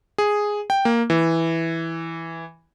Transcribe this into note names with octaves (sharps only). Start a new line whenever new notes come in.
G#4
G5
A#3
E3